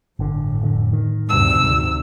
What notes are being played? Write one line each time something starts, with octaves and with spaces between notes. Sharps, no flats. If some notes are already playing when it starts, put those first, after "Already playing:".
G1 A2 D3
F1 A#2 D3
D#3
D2 G2 C3 E6
D2 G#2 C3